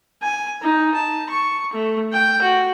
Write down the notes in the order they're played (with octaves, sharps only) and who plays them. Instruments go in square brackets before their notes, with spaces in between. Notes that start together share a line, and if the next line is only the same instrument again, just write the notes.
[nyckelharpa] G#5
D#4
A5
C#6
A3
G5
F#4